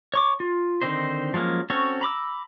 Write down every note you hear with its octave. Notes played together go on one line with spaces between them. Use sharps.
C#5 C#6 D6
F4
D3 D#3 C4 D#4 C5
F3 F#3 G#3 A#3 C#4
C4 C#4 F#4 A4 C#5
A#5 B5 D6 E6